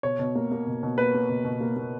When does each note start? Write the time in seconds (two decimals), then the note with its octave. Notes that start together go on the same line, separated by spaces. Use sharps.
0.03 B2 C#5
0.19 B2
0.35 A#3
0.51 A#3
0.67 B2
0.83 B2
0.97 A#3 B4
1.14 A#3
1.29 B2
1.45 B2
1.61 A#3
1.76 A#3